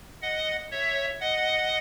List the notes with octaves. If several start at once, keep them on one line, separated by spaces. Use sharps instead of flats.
D#5 F#5
C#5 E5
D#5 F#5